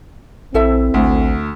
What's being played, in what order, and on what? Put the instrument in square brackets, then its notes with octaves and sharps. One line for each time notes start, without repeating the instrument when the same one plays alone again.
[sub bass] A#1 [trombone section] C4 [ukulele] E4 A4 E5
[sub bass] A1 [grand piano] D2